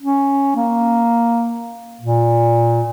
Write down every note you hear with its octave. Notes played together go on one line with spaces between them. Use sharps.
C#4
A#3
A#2